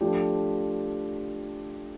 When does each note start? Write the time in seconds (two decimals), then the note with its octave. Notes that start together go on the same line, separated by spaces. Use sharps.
0.01 F3 A3 D4 G4